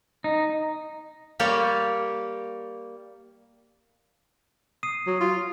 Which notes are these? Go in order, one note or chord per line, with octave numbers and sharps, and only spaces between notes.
D#4
G3 A#3 G4 C#5 D5
D#6 C7 D#7
F#3
F4